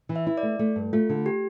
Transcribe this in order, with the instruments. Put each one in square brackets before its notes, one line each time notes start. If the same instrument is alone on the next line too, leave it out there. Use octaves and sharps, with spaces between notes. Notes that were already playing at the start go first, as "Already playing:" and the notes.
[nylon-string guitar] E3
[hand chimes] E5
[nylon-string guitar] E4
[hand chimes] D5
[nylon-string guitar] A3
A3
G2
[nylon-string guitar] A3 [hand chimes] F4
[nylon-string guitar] D3
[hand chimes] G4